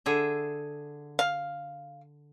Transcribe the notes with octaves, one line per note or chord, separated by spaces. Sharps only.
D3 G#4 E5
F5